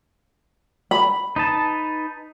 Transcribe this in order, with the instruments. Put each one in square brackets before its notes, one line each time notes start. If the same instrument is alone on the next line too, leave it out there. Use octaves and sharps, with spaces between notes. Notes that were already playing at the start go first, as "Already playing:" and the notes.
[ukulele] B5
[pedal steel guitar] D#4 B4 A5